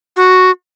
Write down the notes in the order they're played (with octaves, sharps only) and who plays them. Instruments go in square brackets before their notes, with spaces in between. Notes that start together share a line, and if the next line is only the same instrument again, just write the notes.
[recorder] F#4